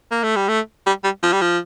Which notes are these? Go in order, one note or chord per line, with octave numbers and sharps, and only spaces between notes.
A#3
A3
G3
A3
G3
G3
F3
G3
F3